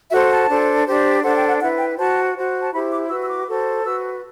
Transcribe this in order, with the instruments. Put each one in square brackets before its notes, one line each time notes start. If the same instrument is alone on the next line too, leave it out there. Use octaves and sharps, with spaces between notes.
[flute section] F#4 A4 C5 E5
A5
D4 A4 C5
D4 G4 C5
D4 A4 C5 F#5
G5
F#5
E4 F#5
B4
G5
F#4 C5 A5
F#4 C5
A5
E4 G4 C5 B5
D6
F#4 B4 E6
E6
D6
F#4 A4 C5
F#4 B4 E6